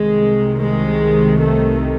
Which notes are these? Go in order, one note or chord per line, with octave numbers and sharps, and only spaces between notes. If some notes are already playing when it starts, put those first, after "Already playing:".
Already playing: C2 C3 D#3 G#3
G#3
A3